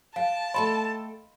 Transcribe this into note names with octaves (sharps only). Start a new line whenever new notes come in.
F5 G5 A5
A3 A4 D#5 G5 B5 C6